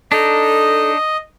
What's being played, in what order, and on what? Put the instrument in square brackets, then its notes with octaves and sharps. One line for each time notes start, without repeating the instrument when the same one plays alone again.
[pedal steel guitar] D4 D#4 [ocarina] A4 [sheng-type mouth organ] D#5